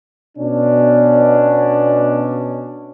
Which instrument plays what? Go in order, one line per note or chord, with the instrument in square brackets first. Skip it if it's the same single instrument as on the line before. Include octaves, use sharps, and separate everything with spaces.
[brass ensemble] B2 C#4 D4